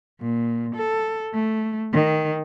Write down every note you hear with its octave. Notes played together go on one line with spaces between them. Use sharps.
A#2
A4
A3
D#3